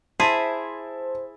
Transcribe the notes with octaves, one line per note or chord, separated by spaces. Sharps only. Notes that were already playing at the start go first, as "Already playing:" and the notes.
E4 G#4 C5 E5 A5